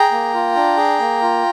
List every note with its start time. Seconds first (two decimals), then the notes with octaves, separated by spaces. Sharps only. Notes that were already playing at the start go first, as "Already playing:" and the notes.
Already playing: G#4 G5 A#5
0.12 A#3
0.33 F4
0.56 D4
0.77 G#4
1.00 A#3
1.21 F4